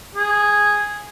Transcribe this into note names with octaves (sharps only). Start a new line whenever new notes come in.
G#4